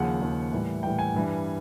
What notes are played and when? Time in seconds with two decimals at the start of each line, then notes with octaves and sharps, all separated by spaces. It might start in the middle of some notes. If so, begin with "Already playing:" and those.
Already playing: D#2 C#3 F3 F#5
0.21 D#2 C#3 F3
0.52 A2 E3 G3
0.83 A2 E3 G3 G5
0.99 G#5
1.14 G2 E3 G3